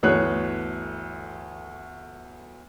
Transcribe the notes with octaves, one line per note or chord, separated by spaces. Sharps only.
G1 D2 E3 G#4 C#5 F#6